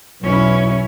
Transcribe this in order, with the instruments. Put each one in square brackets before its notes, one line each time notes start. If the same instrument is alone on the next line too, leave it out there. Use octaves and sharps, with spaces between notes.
[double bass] B1 E2 [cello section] C#4 E4